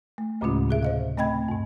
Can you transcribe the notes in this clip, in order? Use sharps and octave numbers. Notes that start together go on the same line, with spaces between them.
A3
D2 A2 C#3 G#3 C#4 F4
C3 G#4 E5
C5 D#5 F5
A3 C4 D#5 G5 B5 G#6
G2 B2